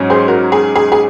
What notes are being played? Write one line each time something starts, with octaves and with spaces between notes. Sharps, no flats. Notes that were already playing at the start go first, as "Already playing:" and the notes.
Already playing: G#2 F#3 C#4
G#4 C5
F#4 A#4
G#4
G#4
G#4